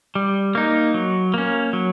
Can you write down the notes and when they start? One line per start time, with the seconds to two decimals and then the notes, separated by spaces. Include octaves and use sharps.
0.15 G3
0.55 A#3 D#4
0.94 F#3
1.34 A#3 C#4
1.73 F#3